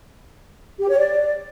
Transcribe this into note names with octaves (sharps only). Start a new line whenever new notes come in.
G4
C#5
D5